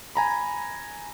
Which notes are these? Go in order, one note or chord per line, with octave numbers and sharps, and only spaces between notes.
G#5 A#5 B5